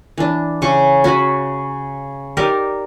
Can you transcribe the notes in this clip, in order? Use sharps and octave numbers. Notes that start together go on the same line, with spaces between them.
E3 D4
C#3 G#5 C#6
C#4 F#4 G#5 B5
D#4 G4 A#4 D5